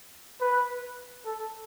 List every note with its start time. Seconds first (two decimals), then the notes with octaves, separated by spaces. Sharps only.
0.41 B4
1.26 A4